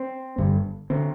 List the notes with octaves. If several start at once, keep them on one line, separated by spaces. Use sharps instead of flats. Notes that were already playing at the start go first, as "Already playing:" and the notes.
Already playing: C4
G1 G2 D3
D3 C4